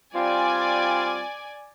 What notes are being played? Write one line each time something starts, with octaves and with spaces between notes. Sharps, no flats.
G3 C4 F4 D5 G#5